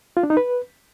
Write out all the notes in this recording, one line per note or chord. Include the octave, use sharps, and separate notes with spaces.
F4
D4
D#4
B4